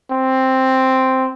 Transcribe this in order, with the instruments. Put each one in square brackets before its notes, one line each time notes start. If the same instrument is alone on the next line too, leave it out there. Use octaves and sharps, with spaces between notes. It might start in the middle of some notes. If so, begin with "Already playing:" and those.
[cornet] C4